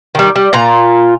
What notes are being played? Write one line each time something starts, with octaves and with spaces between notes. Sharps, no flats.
D#3 G3
G3
A#2 F4 A#5